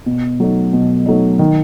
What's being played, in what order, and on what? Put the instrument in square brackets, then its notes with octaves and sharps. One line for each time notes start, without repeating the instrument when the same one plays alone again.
[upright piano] B2
F#3 A3 D#4
B2
F#3 A3 D#4
D#3